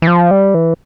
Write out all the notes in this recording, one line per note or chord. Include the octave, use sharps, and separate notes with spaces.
E3
F3
G3
E3